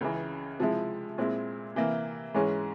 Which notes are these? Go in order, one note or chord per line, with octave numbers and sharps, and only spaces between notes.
C#2 C#3 E3
C3 F3 G#3 E4
A#2 G#3 C4 E4
C3 E3 A#3 E4
G#2 E3 G#3 C#4